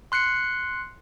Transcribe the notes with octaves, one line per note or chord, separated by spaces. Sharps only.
C6 F#6 C7 C#7